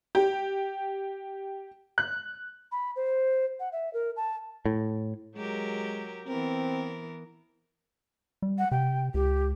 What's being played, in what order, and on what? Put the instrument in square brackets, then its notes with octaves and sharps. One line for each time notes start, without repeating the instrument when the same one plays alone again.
[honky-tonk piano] G4
F#6
[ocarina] B5
C5
F#5
E5
A#4
A5
[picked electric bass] A2
[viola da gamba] F#3 G4 A#4 [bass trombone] G#3
[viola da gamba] E3 B3 A#4 [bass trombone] C4
[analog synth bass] G3
[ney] F#5
[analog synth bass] C3 [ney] G5
[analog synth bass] C#2 [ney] G4